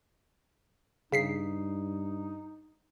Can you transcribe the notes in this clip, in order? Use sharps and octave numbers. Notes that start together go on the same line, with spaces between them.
G2 C#3 D#4 B6 C7